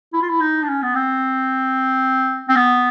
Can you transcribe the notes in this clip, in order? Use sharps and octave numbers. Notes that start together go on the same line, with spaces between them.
E4
F4
E4
D#4
D4
C#4
B3
C4
C4
B3